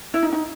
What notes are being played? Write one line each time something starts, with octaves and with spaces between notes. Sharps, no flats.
E4
D#4
D#4